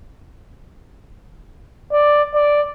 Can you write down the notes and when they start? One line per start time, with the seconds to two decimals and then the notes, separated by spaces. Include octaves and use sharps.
1.92 D5
2.34 D5